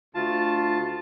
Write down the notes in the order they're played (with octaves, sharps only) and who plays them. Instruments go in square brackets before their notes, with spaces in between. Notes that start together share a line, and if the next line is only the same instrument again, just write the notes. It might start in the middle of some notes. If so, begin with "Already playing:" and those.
[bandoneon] D2 F4 A5